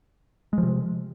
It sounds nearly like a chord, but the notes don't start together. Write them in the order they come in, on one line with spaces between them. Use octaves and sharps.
G#3 F3 C3